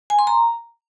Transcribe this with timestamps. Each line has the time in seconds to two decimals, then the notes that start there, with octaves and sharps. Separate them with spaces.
0.10 G#5
0.19 C6
0.27 A#5